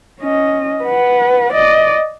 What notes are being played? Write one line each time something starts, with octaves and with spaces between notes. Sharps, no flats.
C#4 D#5
B4 F#5
D5 D#5